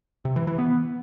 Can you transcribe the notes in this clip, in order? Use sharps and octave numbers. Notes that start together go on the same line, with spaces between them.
C3
E3
E3
B3